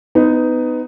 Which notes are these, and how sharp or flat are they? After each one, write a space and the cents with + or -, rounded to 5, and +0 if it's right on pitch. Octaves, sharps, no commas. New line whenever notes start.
B3 +20 D#4 +0